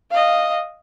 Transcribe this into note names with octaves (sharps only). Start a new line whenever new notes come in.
D#5 F5